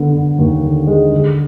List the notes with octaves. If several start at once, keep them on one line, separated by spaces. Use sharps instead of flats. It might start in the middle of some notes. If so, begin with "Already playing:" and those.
Already playing: D3 B3
D3
D#2
D3
G#3
D3